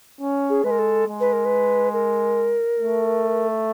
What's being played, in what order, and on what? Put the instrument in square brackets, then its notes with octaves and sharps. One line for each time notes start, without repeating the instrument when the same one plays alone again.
[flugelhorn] C#4
[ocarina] G#4
[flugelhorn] G#3 [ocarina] B4
[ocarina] A#4
A4
[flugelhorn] G#3
[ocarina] B4
A#4
B4
A#4
[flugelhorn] A3